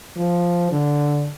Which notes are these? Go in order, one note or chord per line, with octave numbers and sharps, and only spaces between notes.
F3
D3